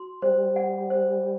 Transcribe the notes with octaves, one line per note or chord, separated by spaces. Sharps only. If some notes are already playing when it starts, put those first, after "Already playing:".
Already playing: F#4 C6
G3 C5
F#5
C5